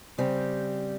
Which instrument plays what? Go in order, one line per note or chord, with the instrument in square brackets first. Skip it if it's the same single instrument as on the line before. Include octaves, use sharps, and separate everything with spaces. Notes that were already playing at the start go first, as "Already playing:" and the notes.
[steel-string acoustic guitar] C#3 G3 C4 G4